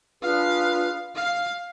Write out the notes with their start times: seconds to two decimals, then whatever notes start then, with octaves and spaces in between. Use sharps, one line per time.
0.22 D4 F4 G#4 B4 F5
1.16 F5